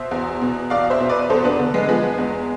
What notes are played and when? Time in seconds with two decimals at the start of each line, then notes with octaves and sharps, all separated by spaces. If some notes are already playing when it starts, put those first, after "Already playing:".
Already playing: B2 C5 E5
0.11 E2
0.42 B2
0.70 E2 D5 F5
0.90 C5 E5
1.00 B2
1.09 B4 D5
1.29 E2 A4 C5
1.44 B3 D4
1.59 D3
1.74 G#3 B3
1.89 F3 G#3 B3
2.18 E2